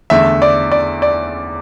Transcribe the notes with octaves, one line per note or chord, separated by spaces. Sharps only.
E2 D3 A3 E5
D5
D5
D5